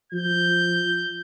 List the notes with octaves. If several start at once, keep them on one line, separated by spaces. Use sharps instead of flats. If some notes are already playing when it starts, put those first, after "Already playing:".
F3 G6